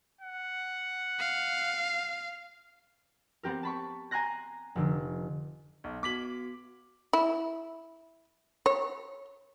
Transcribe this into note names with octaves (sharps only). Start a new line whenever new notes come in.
F#5
F5
B3 C4 G4 A#4
A5 B5 C#6
G#5 A#5 C6 F#6 A#6
F1 D3
B1
B3 F#4 D6 B6 F#7
E4
C#5